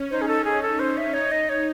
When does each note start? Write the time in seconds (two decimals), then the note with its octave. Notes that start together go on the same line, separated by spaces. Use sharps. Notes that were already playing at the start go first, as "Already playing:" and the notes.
Already playing: C#4
0.11 D#4 C5
0.21 G#4
0.28 A4
0.45 G#4
0.62 A4
0.80 C5
0.97 E5
1.14 D#4 C#5
1.31 D#5
1.49 C#5